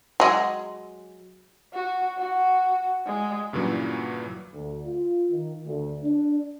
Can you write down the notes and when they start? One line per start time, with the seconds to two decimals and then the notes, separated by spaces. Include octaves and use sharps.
0.20 F#3 G#3
1.73 F#4
2.18 F#4
3.06 G#3
3.53 G2 A#2 C#3 E3 F#3
4.53 D2
4.86 F4
5.31 D#3
5.66 D2
6.04 D4